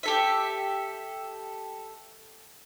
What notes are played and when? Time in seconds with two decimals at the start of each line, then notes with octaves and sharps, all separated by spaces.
0.03 G4 A4 E5